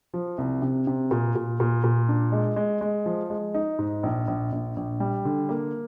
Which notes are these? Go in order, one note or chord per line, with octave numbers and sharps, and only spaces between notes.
F3
C2
C3
C3
A#2
A#2
A#2
A#2
D4
G#3
G#3
G#3
F3
G#3
D#4
G#2
A#1
A#1
A#1
A#1
G3
D3
A#3